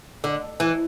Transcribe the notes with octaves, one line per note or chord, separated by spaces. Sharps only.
D3
E3